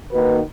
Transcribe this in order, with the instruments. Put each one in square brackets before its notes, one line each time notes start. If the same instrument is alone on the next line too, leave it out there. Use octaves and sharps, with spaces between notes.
[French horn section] D#3 A#3 D#4 F#4 B4